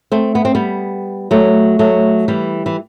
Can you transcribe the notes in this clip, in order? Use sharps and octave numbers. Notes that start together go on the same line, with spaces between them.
A3 C4
B3
C4
G3 B3
F#3 A3
F#3 A3
E3 G3
E3